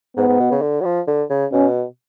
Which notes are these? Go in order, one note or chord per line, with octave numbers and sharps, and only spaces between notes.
G#2 B3
G#2
B2
C#3
D3
F#3
F3
D3
C#3
B2 C#4